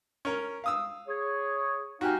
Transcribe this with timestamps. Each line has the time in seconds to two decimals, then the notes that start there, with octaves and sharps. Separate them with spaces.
0.25 C#4 A#4
0.64 F5 D#6 E6
1.08 G#4 C#5
2.01 D#4 F#4 G4 F5 G#5